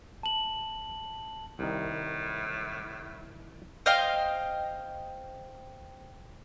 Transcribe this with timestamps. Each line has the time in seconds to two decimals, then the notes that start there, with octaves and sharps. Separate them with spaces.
0.23 A5 F#7
1.59 C2 A2 D#3
3.86 C5 D#5 F5 G5